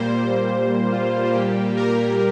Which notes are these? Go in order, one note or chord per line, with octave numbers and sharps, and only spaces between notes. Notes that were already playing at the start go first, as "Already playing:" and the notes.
Already playing: A#2 G3 A#3 C5
F4
A#2 G3 A#3 G4
A#4